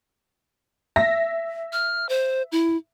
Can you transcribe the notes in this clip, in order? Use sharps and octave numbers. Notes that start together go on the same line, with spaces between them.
E5 A#6
F6
C5
E4